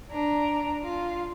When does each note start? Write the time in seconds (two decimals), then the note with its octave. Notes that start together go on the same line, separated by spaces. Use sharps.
0.11 D4 A#5
0.84 F4